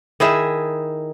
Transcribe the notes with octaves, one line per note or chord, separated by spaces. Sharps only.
D#3 E4 G#4 E5